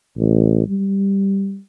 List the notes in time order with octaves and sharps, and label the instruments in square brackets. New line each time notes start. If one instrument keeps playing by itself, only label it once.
[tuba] A1
G3